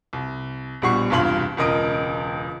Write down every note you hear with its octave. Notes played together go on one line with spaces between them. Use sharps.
C2
A#1 B2 G3 F#5 C#6 C7
E1 C2 G2 F4 C6 F#7
E1 C#2 A#4 D#5 D#6 D7